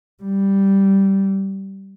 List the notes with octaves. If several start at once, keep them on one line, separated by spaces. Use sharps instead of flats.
G3